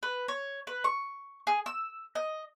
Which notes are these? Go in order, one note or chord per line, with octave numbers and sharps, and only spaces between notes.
B4
C#5
B4
C#6
G#4
E6
D#5